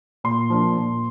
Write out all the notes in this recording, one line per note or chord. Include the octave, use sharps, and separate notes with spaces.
A#2 C6
F3 A#3 D4
A#2